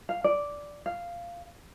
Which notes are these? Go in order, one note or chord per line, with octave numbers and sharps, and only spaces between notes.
F5
D5
F5